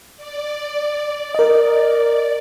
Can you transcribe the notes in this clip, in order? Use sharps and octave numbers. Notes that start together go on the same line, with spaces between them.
D5
A#4 D#5